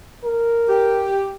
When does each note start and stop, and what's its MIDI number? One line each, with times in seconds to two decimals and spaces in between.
0.24 1.11 70
0.69 1.34 67